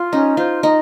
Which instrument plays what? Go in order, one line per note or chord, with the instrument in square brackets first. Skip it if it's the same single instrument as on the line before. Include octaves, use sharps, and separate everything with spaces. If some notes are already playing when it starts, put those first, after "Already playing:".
Already playing: [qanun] F4
[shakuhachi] C#4 [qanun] D#4
[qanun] F4 [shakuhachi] C5
[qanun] D#4 [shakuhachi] D#5